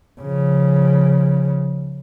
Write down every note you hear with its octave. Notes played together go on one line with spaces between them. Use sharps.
C#3 F3